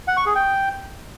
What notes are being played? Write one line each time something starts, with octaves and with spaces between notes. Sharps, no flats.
F#5
C#6
G#4
G5